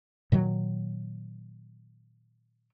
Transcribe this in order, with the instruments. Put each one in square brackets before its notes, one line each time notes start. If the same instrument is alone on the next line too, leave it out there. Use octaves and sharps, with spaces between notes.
[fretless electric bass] A#2 D#3 F#3